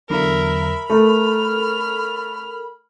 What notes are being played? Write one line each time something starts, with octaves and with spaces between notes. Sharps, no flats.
E2 D3 F#3 A#4 E5 B5
A3 A4 A#4 F6